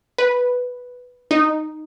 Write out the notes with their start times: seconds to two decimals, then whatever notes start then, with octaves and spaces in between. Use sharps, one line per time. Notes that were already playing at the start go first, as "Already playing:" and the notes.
0.18 B4
1.31 D#4